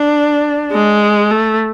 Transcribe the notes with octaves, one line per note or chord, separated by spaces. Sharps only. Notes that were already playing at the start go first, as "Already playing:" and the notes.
Already playing: D4
G#3
A3